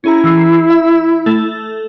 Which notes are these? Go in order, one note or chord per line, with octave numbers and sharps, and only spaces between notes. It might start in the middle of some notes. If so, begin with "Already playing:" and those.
C#4 E4 G#4 A#5
E3 E6 C7
E5
A3 A4